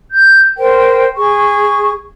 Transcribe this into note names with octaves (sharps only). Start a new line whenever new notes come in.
G6
A#4 C5 G5
G#4 C#6